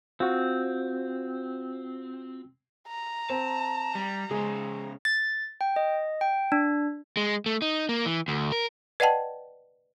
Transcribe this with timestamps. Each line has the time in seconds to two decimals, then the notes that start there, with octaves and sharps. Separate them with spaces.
0.20 C4 F4 F#4
2.88 A#5
3.30 C4 A5
3.95 G3
4.31 C#3 G#3 G#4 C5
5.05 A6
5.61 G5
5.76 D#5
6.21 G5
6.52 D4
7.17 G#3
7.46 A3
7.62 D#4
7.89 A#3
8.05 E3
8.28 D2
8.52 A#4
9.00 B4 D5 D#5 F#5 G5 A5